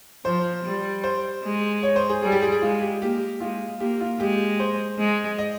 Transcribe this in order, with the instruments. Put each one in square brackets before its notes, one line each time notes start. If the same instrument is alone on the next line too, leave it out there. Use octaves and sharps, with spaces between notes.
[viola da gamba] F3 [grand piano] C5
[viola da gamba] G3
[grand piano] C5
[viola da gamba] G#3
[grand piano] C#5
C5
G#4
[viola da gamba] G3 [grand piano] G#4
[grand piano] G4
G#4
G#4
[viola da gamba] G#3 [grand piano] F4
[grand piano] G4
[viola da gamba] A#3 [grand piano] G4
[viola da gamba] G#3 [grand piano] F4
[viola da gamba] A#3 [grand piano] G4
[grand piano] F4
[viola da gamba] G#3 [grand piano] G4
[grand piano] C5
[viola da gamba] G#3
[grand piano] D#5